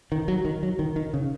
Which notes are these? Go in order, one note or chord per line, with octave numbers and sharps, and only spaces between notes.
D#3
F#3
D#3
F#3
D#3
D#3
C#3